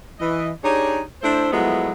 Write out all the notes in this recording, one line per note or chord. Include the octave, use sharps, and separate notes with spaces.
E3 D#5
D4 D#4 G4 G#4 C#5
A3 D4 E4 C5
F3 F#3 G#3 A3 B3 E4